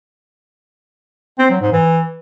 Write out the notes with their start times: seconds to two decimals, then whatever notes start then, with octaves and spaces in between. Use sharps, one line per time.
1.39 C4
1.50 F#3
1.61 G#2
1.72 E3